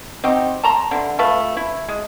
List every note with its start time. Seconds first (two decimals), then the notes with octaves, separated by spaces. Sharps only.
0.24 C4 D#4 F#4 G4
0.64 A5 A#5 C6
0.91 D3 E3
1.19 A3 F4 B4
1.57 E4
1.88 G#3